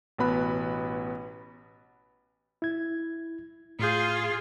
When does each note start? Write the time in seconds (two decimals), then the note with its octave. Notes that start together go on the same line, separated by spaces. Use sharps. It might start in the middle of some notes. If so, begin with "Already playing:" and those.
0.18 A1 B2 B3 B5 F#6
2.62 E4 G#6
3.79 A2 F4 G#4 G6